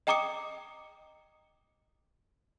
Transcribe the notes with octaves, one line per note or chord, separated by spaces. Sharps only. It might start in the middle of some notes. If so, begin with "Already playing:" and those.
D#5 G5 A#5 D6 D#6 C#7